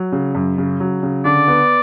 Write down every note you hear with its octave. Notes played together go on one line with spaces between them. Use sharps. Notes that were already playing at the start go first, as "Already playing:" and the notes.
Already playing: F#3
C#3
F#2
C#3
F#3
C#3
D3 D5
B3